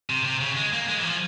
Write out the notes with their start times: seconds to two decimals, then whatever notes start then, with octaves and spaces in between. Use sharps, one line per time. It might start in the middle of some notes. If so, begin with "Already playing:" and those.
0.10 C3
0.25 C3
0.40 C#3
0.56 G#3
0.73 A#3
0.88 G#3
0.97 E3
1.04 F3